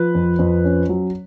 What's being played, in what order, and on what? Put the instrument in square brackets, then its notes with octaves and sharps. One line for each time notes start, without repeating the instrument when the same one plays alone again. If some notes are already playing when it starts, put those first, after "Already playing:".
Already playing: [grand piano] F3 B4
F2
F2
C#4
F#3